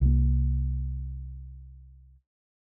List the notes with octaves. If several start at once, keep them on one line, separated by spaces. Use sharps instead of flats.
C2 A#3